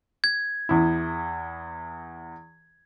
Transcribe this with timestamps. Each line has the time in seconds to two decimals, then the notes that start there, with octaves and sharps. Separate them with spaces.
0.24 G#6
0.69 E2 E4